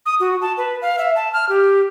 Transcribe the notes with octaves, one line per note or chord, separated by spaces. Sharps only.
D#6
F#4
A5
B4
F5
E5
A5
F6
G4